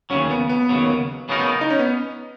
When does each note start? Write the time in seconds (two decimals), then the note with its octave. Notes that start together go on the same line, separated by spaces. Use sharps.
0.10 D#2 C#3 F#3 C#4
0.30 B3
0.49 B3
0.69 D#2 C#3 F#3
1.29 C#3 F#3 B3 D#4 A#4
1.61 D#4
1.70 C#4
1.79 B3